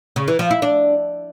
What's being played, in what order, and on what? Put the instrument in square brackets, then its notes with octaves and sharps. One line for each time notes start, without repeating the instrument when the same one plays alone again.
[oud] C#3
E3
F3
E4
D4